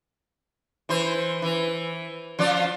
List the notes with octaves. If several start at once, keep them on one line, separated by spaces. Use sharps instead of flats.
E3 C5
E3
F3 F4 D5